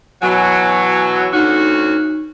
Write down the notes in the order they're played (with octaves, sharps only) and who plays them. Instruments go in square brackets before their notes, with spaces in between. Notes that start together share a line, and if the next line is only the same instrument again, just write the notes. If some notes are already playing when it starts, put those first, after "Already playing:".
[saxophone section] B2 E3 F#3 [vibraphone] G#5 C#6
[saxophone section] D2 C#4 F#4 [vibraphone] D#4